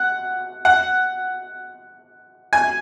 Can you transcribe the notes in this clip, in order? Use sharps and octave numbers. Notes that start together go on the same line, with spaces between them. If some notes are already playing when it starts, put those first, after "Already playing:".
Already playing: F#5
F#5
G#5